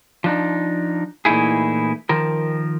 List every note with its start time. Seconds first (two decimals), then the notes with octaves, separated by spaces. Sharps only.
0.24 F3 D4 D#4
1.25 A#2 E3 A3 D#4 E4 G#4
2.09 D#3 F3 A#4